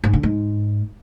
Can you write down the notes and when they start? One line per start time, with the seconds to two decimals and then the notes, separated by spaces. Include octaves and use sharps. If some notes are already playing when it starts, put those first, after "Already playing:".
0.04 G#2
0.13 D3
0.23 G#2